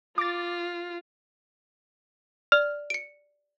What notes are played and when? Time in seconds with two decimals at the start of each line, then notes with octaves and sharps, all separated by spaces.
0.18 F4 D6 A6
2.52 D5 F6
2.90 C#7 D7